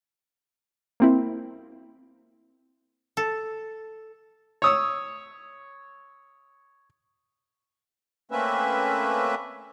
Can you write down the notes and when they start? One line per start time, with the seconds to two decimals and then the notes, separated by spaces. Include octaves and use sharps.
1.00 A#3 C4 E4
3.17 A4
4.62 C#5 D#6 E6
8.31 A3 A#3 C4 C#4 B4 E5